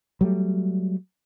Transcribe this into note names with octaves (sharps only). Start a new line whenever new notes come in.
F#3 G3 A3